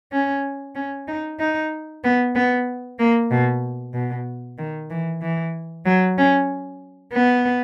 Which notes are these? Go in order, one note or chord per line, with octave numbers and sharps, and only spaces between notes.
C#4
C#4
D#4
D#4
B3
B3
A#3
B2
B2
D#3
E3
E3
F#3
C#4
B3